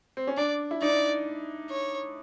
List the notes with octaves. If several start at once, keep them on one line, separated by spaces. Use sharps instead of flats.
C4
C#4
D4 D5
E4
D#4 D5
C#5